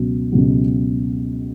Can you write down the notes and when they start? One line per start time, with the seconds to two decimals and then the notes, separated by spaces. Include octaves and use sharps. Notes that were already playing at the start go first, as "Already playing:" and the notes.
Already playing: C#2 B2 F#3
0.32 C#2 B2 F#3